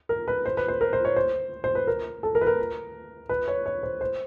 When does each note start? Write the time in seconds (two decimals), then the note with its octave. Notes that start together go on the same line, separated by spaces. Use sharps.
0.09 A#4
0.28 B4
0.46 C5
0.57 B4
0.68 C5
0.81 A#4
0.93 C5
1.05 C#5
1.16 C5
1.64 C5
1.75 B4
1.87 A#4
2.23 A4
2.35 A#4
2.41 B4
2.47 A#4
3.29 B4
3.48 C#5
3.66 C#5
3.83 C5
4.01 C5